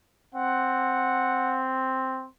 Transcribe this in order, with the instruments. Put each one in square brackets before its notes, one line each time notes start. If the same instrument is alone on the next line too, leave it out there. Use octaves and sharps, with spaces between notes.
[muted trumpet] C4 [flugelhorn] F#5